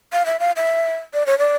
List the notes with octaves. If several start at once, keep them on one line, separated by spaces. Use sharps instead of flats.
F5
E5
F5
E5
D5
C#5
D5